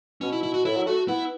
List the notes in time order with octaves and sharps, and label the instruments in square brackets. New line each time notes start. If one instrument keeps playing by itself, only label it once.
[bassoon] B2 [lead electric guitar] C#4
[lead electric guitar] E4
E4
F#4
[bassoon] A2 [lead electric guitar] E4
[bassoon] F#3
[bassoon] A3 [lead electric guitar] F#4
[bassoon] B3 [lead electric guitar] E4